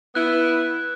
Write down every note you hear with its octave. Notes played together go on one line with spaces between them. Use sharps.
B3 E4 F#6